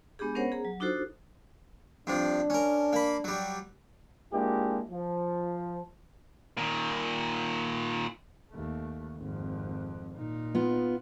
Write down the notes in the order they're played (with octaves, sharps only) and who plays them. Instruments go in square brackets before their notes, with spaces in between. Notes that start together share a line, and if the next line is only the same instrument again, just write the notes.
[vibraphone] G#3 B3 D4 G4 G#4
B3 C#4 A#4 C5 C#5 F#5
G#4 A#5
F#3
D4 D#4 F4 F#4 A4 C5
[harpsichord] G2 C3 F3 [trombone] D4
[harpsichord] C#4 A#4
A#3 B5
F#3 G3
[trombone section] G#3 A#3 D4 E4 F4 G4
F3
[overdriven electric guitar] A#2 D#3
[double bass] D#2 A3
G#1 F2
A#2 D#4
[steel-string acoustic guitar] B3 F4